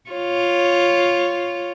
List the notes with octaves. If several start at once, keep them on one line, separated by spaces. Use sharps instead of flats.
F4 C#5